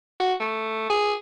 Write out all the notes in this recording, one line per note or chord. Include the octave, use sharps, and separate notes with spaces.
F#4
A3
G#4